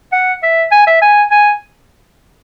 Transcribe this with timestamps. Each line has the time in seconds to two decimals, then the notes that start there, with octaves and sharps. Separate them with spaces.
0.12 F#5
0.43 E5
0.72 G#5
0.87 E5
1.02 G#5
1.31 G#5